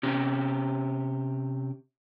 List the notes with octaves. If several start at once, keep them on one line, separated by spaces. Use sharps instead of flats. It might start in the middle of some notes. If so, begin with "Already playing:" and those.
C3 C#4 G4